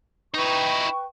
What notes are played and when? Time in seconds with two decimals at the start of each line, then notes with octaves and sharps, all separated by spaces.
0.34 D#4 E4 B4 G5 C#6